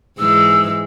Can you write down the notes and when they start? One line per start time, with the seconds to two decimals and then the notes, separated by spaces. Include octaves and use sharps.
0.19 G#2 E3 G#3 E6